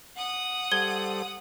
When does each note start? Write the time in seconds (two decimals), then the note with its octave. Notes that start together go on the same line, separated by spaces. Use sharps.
0.17 F#5 D#6
0.72 G3 A4 C5 G#6 G7